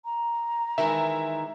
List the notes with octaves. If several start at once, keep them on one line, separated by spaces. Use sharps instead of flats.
A#5
D#3 E3 G#3 E5